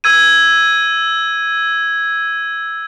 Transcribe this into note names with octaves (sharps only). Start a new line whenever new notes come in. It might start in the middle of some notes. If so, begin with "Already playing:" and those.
E6 G#6 D#7